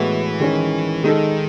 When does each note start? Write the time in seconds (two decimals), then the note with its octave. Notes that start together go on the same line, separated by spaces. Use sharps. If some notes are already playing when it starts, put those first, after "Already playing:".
Already playing: A2 E3 G#3 B3 F#4
0.40 D#3 G#3 C#4
1.04 D#3 G#3 D#4 A4